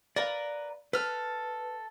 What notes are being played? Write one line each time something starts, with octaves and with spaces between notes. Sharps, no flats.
A#4 B4 D5 F5
A4 B4 F6